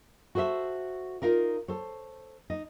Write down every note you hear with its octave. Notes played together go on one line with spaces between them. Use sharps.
F#4 A4 C5 D#5 E5
D#4 F4 A#4 D5
A4 C5 C#5
D#4 D#5